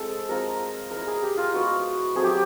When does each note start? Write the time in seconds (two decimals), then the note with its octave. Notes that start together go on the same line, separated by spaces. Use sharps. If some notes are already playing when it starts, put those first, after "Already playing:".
Already playing: G#3 C4 F4 A4
0.29 G#3 C4 F4 A#4
0.91 G#3 B3 E4 A#4
1.07 G#4
1.22 G4
1.37 F4
1.53 G#3 B3 E4 F#4
2.15 F#3 A3 C4 G#4
2.23 G4